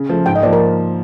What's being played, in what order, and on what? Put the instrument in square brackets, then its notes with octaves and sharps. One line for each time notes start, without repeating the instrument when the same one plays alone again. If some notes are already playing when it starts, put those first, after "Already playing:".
Already playing: [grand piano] C#3
F3 A3
[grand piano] G#2 [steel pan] G5
[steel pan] D#5
[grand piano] F3 A#3 [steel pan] D5
[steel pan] A#4